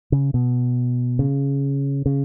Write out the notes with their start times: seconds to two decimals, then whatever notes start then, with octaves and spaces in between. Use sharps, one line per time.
0.12 C#3
0.34 B2
1.19 C#3
2.06 C#3